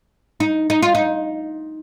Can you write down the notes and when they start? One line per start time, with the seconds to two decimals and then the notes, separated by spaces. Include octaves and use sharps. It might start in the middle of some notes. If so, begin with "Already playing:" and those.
0.40 D#4
0.70 D#4
0.82 F4
0.95 D#4